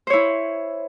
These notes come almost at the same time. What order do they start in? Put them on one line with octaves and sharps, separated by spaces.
C5 C#5 E4